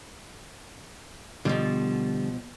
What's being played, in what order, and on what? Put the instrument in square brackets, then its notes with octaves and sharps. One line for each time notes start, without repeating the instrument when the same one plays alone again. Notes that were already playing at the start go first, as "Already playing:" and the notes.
[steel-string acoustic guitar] B2 F3 [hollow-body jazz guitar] D3 G3